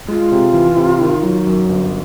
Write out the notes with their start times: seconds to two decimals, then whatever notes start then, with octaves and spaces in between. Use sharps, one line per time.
0.08 G#3 F4
0.32 C3
0.54 E3
0.77 C3
1.01 D#3
1.23 F#3
1.47 F#2
1.69 G1